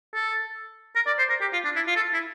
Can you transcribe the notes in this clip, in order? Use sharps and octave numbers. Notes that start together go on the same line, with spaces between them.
A4
A#4
D5
C5
A#4
G4
F4
D4
E4
F4
A4
E4